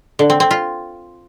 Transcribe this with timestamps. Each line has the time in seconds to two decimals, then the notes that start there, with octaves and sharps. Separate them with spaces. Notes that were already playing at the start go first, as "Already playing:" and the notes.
0.19 D3
0.30 C4
0.40 C4
0.51 F4